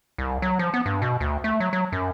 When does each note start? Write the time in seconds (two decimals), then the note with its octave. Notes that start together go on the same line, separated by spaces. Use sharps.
0.18 C2
0.42 F#3
0.59 F3
0.74 B3
0.86 G2
1.02 B2
1.20 D2
1.44 A3
1.60 F#3
1.73 F#3
1.92 F#2